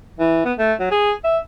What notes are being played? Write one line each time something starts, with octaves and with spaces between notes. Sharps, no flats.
E3
B3
A3
F#3
G#4
E5